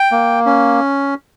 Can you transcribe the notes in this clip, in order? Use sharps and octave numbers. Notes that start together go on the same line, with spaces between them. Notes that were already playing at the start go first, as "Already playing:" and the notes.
Already playing: G5
A#3
C#4